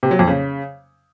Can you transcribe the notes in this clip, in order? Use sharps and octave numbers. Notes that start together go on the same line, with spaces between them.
C3
F#3
F2
C#3